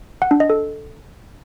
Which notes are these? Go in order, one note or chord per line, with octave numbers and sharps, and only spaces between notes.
F#5
D4
D#5
A4